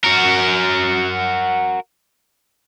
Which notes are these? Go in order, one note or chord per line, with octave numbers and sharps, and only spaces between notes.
F#4 A#4